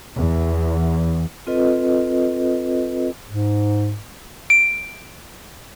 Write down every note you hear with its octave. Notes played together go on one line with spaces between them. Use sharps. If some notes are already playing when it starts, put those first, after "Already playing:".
E2
C4 F4 A4 B4 D#5
G#2
D7